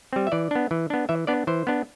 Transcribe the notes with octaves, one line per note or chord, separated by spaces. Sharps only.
G3 C4
E5
E3 D5
B3 D4
E3
B3 D4
E3 E5
B3 D4 D5
E3 C5
B3 D4